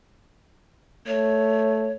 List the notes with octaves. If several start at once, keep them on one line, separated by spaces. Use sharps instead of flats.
A3 C#5